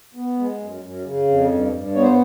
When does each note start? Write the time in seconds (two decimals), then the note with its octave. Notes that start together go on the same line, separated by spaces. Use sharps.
0.15 B3
0.37 G#3
0.59 F#2
0.82 F#2
1.04 C#3
1.27 F2
1.50 G2
1.72 G2
1.95 B3 C#5
2.02 C5